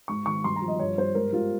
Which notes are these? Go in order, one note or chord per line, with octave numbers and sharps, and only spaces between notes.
G#2 C#6
D#3 C#6
G2 C6
A#5
F3
D#5
G2 C#5
G3 C5
G#2 A#4
G3 F4